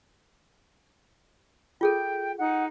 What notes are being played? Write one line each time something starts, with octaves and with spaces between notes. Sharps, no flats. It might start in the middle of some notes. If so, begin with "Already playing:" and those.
F4 G#4 A4 G5
D#4 F#5